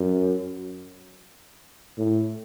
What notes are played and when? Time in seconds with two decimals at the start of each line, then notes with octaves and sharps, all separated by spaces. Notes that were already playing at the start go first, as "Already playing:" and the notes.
Already playing: F#2
1.98 A2